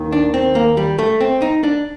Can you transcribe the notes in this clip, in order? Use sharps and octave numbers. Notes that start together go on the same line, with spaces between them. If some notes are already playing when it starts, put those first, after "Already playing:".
Already playing: D#2 D#3
D4
C4
A#3
G3
A3
C4
D#4
D4